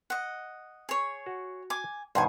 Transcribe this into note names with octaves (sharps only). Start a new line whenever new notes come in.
D#5 F#5
G#4 C#5
F#4
G#5 D6
G2 B2 D#3 C5 F#5 G#5